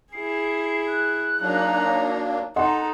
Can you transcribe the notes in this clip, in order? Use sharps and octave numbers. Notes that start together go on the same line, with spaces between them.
E4 G#4 C7
F#6
F#3 A#3 D4 D#4 A#5
D#4 A4 D#5 F#5 A#5 C6